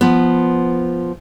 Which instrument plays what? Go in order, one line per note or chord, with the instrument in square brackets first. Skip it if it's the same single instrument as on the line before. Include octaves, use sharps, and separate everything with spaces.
[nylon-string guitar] F3 B3